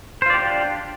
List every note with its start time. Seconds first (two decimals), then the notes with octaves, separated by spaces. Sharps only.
0.22 C5
0.26 F4
0.30 D5
0.34 G4
0.38 D4